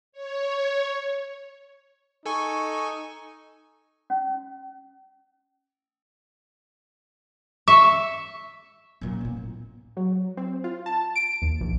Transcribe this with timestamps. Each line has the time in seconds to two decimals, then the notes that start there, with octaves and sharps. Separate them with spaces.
0.12 C#5
2.26 D#4 A4 G#5 C#6
4.10 C#4
7.68 E5 C#6
9.01 F#2 A#2
9.21 B3 C#4
9.36 A2
9.97 F#3
10.37 C4
10.64 F4
10.86 A5
11.16 D7
11.42 D#2
11.61 A#1